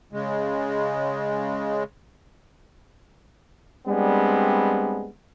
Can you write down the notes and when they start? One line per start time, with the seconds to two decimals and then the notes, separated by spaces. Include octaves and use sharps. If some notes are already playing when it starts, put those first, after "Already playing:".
0.13 C#3 G#3
3.88 G3 G#3 B3 C4 D4